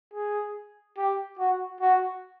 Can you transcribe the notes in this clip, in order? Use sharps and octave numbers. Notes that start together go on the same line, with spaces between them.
G#4
G4
F#4
F#4